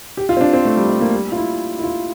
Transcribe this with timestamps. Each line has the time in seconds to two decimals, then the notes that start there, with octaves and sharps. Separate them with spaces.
0.17 G4
0.29 F4
0.37 C4
0.41 D4
0.53 C4
0.65 A3
0.77 G3
0.89 A3
1.01 A#3
1.12 G3
1.32 F4
1.37 E4
1.79 E4
1.84 F4